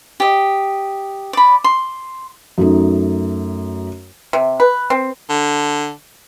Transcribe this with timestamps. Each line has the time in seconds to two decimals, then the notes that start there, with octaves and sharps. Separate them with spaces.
0.20 G4 D#5
1.33 D5 B5
1.64 C6
2.58 F#2 A3 D#4
4.33 C3
4.60 B4
4.90 C4
5.30 D3